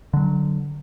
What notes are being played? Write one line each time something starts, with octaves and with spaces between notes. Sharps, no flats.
D3 F#3